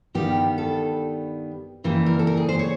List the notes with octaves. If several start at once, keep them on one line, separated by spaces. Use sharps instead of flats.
G2 D#3 G3 B3 G4
A4
F#2 C#3 E3 G3 A#3 B4
A#4
A4
A#4
G#4
C5
C#5